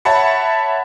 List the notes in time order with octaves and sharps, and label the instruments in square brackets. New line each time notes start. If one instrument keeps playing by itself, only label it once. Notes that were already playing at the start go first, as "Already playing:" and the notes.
[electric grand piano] C#5 E5 F#5 A5 B5 C#7